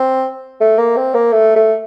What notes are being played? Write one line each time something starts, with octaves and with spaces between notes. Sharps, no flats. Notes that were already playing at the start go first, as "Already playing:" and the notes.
Already playing: C4
A3
A#3
C4
A#3
A3
A3